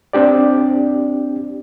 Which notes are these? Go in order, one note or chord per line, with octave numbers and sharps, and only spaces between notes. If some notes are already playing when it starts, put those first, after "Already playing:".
C4 D4 G4 D5